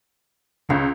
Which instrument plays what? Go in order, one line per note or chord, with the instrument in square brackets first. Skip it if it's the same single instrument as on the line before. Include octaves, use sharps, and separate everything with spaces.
[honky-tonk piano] C#2 [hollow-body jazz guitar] C#3